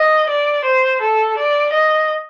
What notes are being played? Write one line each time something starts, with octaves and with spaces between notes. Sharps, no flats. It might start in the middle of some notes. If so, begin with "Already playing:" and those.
Already playing: D#5
D5
C5
A4
D5
D#5